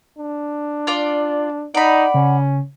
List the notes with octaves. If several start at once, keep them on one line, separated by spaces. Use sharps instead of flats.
D4
F4 D5
D#4 D5 F#5 B5
C#3 C#4